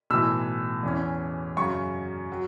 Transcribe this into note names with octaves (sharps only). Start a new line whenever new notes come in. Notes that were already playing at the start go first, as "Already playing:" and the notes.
B1 A2 E3 E6
E2 E3 C#4
F#2 C#3 F#3 C#6
F#3